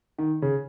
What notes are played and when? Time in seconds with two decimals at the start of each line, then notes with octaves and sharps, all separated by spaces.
0.18 D#3
0.42 C#3